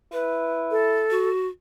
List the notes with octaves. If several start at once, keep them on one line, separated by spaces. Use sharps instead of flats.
E4 B4
A4
F#4